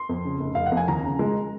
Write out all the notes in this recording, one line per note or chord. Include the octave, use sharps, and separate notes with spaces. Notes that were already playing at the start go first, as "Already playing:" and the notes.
Already playing: C6
F2
C#3
F1
F1 F5
F#5
F2
G#5
D#2 A#5
C#3
G#3